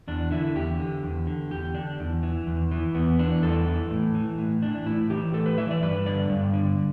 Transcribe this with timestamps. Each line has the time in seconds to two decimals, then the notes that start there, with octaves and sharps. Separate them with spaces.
0.08 E2 D4
0.31 D3 E4
0.55 E2 G4
0.80 D3
1.03 E2
1.27 D3
1.51 E2 G4
1.74 D3 D4
2.00 E2
2.23 E3
2.47 E2
2.71 E3
2.95 E2 B3
3.19 E3 D4
3.42 E2 A4
3.66 E3
3.90 A2
4.15 E3
4.38 A2
4.62 E3 D4
4.86 A2 E4
5.10 E3 G4
5.33 A2 A4
5.46 B4
5.58 E3 E5
5.71 D5
5.82 G2 B4
6.06 D3 D5
6.29 G2
6.53 D3